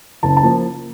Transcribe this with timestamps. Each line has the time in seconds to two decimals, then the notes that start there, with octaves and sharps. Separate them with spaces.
0.23 F#1 A5
0.37 A5
0.43 F3 A#3